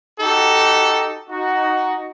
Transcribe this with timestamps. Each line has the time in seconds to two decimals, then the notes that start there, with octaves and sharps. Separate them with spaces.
0.20 D#4 F#4 G4 A4
1.30 D#4 F#4